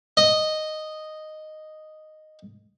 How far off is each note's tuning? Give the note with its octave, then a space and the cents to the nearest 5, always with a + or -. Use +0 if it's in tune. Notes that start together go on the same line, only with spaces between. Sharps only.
D#5 -5